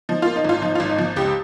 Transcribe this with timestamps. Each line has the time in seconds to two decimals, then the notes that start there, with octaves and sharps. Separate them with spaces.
0.09 F3 D#4
0.22 A#3 F4
0.36 D#4
0.44 G#1 F4
0.62 F3 D#4
0.75 G#1 F4
0.89 D#4
0.98 F3
1.16 C#2 G4